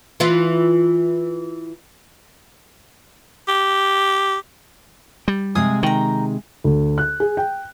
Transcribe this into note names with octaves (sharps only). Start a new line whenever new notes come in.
E3 F4
G4
G3
C3 G#3 G#4 F5 G#5 D#6
D#3 G5 A#5
D2
F#6
G#4
G5